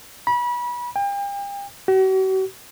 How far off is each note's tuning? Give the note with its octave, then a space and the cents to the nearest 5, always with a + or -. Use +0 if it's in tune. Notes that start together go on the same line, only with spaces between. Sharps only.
B5 -30
G5 +40
F#4 +45